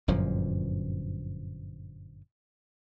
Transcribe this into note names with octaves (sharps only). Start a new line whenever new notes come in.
G1 F#2 A#2 F3